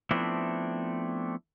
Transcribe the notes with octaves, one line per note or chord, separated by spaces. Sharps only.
F3 A3 B3 C4 D4 E4